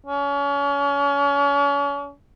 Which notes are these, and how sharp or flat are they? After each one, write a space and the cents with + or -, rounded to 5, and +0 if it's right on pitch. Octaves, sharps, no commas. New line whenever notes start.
C#4 +35